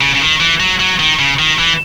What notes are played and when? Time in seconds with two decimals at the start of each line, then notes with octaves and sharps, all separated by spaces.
0.01 C#3
0.15 C#3
0.21 D#3
0.40 E3
0.60 F#3
0.80 F#3
0.99 D#3
1.19 C#3
1.39 D#3
1.58 E3